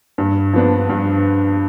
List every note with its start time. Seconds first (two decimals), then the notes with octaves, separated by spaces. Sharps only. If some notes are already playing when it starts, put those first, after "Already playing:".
0.18 G2
0.53 F3 B3 D4
0.89 G2